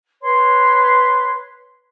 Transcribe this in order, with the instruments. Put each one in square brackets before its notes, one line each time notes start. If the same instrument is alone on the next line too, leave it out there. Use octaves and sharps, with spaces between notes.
[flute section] B4 C#5 C6